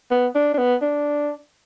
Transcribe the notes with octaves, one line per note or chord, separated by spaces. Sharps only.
B3
D4
D4
B3
D4